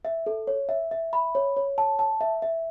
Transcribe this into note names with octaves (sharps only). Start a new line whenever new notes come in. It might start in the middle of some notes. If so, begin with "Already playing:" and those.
E5
A4
C#5
E5
E5
B5
C#5
C#5
A5
A5
E5
E5